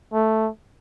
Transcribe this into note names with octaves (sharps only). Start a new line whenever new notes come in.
A3